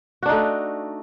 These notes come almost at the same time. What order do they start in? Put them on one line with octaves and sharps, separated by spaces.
F#4 D4 D#4 A3